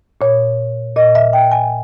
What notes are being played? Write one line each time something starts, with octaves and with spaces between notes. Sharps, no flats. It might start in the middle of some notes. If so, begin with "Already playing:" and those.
A#2 C#5
A#2 D#5
E5
G5
G#5